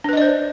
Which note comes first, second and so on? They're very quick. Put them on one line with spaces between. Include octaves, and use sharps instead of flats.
D4 B4 D#5 D5 C5